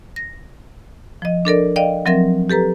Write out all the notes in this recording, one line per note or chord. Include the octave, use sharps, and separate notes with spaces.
A#6
F3 D#5
D4 A4 A#4 D5
D5 D#5 F5 G5
F3 F#3 C4 A#4 E5 A#6
G4 A4 B4 A#5